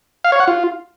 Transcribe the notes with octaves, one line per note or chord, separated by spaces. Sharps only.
F5
C#5
F#5
F4